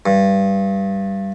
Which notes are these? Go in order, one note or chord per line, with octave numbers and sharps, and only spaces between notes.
G2